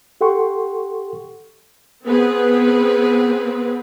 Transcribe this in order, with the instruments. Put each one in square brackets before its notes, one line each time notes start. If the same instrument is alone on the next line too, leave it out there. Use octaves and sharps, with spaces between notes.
[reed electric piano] G4 A4 F#5 G5 C6 C#6
[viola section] B3 C4 G#4 B4